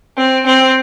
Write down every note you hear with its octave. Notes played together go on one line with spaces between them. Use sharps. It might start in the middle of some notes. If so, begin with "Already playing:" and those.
C4
C4